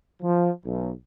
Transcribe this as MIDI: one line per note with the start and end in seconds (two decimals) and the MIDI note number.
0.23 0.50 53
0.66 0.90 35